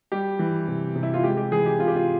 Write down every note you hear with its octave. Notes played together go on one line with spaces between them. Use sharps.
G3 G4
E3
C3
C3
E4
F4
G#3 G4
G4
E3 G#4
G4
C3 F4
G4
F4